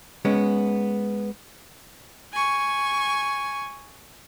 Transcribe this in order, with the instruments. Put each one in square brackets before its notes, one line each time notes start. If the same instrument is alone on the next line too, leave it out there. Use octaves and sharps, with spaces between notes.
[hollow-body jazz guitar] G#3 B3 C#4
[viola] G#5 C#6